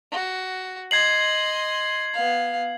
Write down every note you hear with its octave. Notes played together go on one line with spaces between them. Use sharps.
F#4
D#5 C6 G#6 C7 F#7
B3 F5